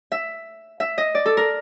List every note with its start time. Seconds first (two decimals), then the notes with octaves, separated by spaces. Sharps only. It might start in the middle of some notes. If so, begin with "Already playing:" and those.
0.12 E5
0.80 E5
0.98 D#5
1.15 D5
1.26 A4
1.37 A#4